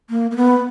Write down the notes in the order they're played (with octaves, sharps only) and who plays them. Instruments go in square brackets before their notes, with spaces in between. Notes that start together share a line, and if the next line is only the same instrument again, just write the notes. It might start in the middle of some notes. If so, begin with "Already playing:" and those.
[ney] A#3
A#3
B3